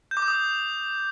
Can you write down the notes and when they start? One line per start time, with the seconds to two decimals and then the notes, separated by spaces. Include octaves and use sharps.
0.11 G6
0.17 D6
0.22 G6
0.28 D#6